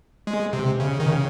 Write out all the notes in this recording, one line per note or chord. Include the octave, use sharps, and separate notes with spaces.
G#3
C3
C#3
D#3
C#3